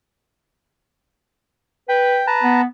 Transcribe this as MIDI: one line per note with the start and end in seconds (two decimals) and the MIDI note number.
1.89 2.23 71
1.89 2.27 79
2.27 2.62 71
2.27 2.62 81
2.27 2.62 82
2.43 2.64 59